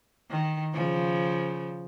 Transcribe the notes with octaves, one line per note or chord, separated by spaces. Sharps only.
D#3
C#3 F3